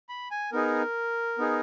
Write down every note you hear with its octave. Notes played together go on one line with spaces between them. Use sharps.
B5
G#5
B3 D#4 G#4 A#4
B3 D#4 G#4